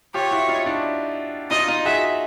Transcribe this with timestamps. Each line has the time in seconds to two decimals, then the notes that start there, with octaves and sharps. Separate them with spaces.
0.14 F4 G4 C#5
0.31 E4 F#4
0.49 D#4 F4
0.66 D4 E4
1.51 D#4 F4 D#5
1.68 D#4 F4
1.86 F#4 G#4 E5